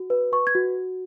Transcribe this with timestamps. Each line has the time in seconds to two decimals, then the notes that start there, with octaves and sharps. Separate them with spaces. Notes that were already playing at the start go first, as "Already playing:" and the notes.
Already playing: F#4
0.10 B4
0.32 B4 C#6
0.47 G#6
0.55 F#4